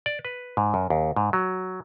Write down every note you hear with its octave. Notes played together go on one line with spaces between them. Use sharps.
D5
B4
G#2
F#2
D#2
G#2
F#3